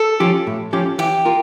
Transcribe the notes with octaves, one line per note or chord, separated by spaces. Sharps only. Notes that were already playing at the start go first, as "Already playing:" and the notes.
Already playing: A4
F3 C#4 G4
A2
F3 C#4 G4
E3 G4
F4 A#4